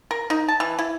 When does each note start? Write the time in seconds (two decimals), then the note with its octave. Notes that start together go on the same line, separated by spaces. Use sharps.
0.11 A#4
0.30 D#4
0.48 A5
0.60 E3
0.79 E4